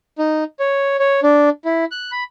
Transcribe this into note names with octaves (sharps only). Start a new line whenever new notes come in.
D#4
C#5
C#5
D4
E4
F#6
B5